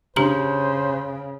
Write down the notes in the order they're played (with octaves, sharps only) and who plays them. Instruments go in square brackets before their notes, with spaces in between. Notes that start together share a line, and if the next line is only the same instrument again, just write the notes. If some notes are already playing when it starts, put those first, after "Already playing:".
[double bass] C#3 [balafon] D4 G4 A#5 [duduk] C5